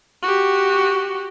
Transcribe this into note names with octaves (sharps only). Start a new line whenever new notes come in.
F#4 G4